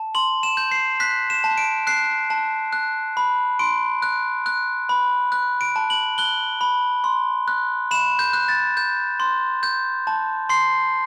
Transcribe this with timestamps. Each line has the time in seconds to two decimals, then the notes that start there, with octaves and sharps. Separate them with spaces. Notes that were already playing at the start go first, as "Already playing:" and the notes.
Already playing: A5
0.15 C6 F#7
0.43 E7
0.57 G6
0.71 C7
1.00 F#6 B6
1.30 E7
1.44 A5
1.58 D7
1.87 F#6 C7
2.30 A5
2.73 F#6
3.17 B5
3.59 C6 D7
4.02 F#6
4.46 F#6
4.89 B5
5.32 F#6
5.61 D7
5.76 A5
5.90 F#7
6.18 F#6 G7
6.61 B5
7.04 C6
7.48 F#6
7.91 B5 E7
8.19 G6
8.33 F#6
8.49 A6
8.77 G6
9.20 C6
9.63 G6
10.07 A5
10.50 C6 C7